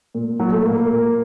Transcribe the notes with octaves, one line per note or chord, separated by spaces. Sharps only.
A#2
A#2 F#3
A3
A#2 A#3
A#3
A#2